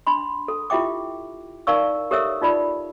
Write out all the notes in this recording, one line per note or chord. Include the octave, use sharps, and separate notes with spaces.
D4 B5 C6
A4
E4 F4 G4 E5 G5 D6
D#4 A#4 D5 F5 C#6 E6
G4 A4 A#4 C#5 E5 E6
D#4 F4 D5 B5